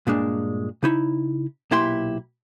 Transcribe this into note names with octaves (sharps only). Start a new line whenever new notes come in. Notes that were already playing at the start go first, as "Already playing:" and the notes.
G2 A#2 G#3 D4
C#3 D#4 E4
B1 A#2 E4 G4 C6